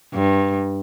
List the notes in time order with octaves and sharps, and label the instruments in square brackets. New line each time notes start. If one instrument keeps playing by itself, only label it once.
[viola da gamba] G2